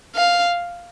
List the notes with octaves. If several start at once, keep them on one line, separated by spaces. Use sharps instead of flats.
F5